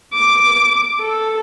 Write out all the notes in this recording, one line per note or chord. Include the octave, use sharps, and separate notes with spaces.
D6
A4